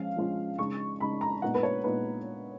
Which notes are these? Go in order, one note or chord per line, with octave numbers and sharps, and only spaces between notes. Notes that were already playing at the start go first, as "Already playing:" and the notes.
Already playing: F3 G#3 C#4 F4 F5
F3 G#3 C#4 F4
C#3 G#3 D#4 C#6
C#3 G#3 D#4 B5
A#5
A#2 G#3 B3 D#4 F#5
B4
C#5
A#2 G#3 B3 D#4 B4